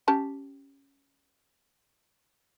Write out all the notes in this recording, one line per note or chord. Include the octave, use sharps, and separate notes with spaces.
C#4 G4 A5